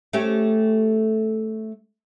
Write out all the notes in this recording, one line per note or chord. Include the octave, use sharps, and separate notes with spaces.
A3 C#4 G4